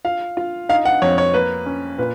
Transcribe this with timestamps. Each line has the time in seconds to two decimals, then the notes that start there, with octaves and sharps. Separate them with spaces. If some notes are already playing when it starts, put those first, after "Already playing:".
0.05 F4 F5
0.37 F4
0.69 D#4 F5
0.85 F#5
1.02 F2 C#5
1.18 C#5
1.34 A#3 B4
1.66 C#4
1.99 A#2 B4